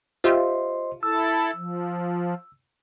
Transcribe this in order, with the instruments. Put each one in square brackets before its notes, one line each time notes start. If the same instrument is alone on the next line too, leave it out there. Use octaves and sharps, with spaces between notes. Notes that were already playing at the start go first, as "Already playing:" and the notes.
[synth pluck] F4 G4 E5 [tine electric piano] C5 D#5 C6
[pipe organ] E4 A4 A5 [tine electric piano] E6
[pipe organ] F3